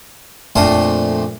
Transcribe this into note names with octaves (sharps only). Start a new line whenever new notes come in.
F2 A#2 A3 D4 C6 D#6